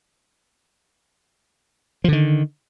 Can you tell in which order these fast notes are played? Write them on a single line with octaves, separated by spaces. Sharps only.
F3 D3 D#3